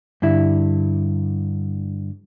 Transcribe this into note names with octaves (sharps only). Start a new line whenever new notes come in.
G2 D3 E4